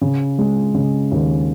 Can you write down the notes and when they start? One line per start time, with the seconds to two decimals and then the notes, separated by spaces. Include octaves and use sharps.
0.01 C#3
0.39 G#3
0.74 C#3
1.11 D#2